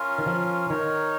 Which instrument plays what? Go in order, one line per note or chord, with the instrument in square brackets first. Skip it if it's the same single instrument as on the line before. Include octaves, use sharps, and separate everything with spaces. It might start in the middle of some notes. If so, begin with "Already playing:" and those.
Already playing: [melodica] C#4 F4 A#4
[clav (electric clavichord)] D#3
F3
[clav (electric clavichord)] D#3 [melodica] D#4 A#4 C#5